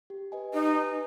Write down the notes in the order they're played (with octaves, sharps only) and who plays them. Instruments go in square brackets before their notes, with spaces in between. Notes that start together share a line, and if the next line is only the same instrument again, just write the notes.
[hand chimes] G4
B4 D#5 G#5
[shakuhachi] D#4 [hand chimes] G4
[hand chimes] B4 D#5 G#5